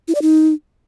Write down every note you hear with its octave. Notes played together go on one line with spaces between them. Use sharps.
E4
D5
D#4